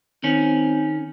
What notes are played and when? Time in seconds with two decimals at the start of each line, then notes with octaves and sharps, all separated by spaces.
0.24 D#3 C4 C#4